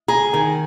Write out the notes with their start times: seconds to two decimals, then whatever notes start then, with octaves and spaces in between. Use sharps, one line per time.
0.08 G#4 A#5
0.33 D#3 G#5